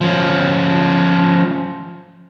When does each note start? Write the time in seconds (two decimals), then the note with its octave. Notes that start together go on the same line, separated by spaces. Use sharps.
0.01 F3 C#4